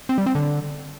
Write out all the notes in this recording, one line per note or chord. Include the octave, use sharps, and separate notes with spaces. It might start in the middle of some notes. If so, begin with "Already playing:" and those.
C4
G3
C4
D3